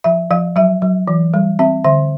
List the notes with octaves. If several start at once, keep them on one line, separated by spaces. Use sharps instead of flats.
F3 E5
F3 F5
F#3 E5
F#3
E3
G3
C4 E5
D3 E5